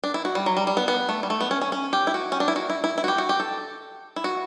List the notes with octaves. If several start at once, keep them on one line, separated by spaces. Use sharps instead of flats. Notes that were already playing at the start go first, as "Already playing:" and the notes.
D4
E4
F#4
G3
F#3
G3
G3
B3
B3
A3
G3
A3
B3
C#4
C#4
C#4
G4
E4
F#4
C#4
D4
E4
F#4
E4
E4
E4
F#4
G4
F#4
G4
A4
E4
F#4